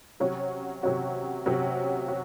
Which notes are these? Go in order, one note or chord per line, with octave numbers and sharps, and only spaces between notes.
C3 F#3 C#4 F#4
C3 F#3 C#4 F#4
C3 F#3 C#4 F#4
F#4